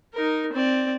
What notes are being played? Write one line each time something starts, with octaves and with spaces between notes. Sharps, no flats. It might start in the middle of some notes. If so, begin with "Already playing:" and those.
D#4 A#4
C4 D5